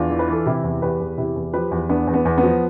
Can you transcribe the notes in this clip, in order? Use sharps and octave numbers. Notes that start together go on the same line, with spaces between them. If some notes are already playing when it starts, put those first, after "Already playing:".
Already playing: E2 D4 F4
E3
B4
E3 A4
C3 E4 G4
E2
E2 G4 B4
E2
C3 E4 G4
E2
F3 G4 B4
E2
E2 B3 D4
E2
B3
E2
B3
F3